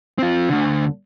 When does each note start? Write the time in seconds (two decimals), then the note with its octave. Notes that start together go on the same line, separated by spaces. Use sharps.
0.18 C4 F4
0.49 D2 D3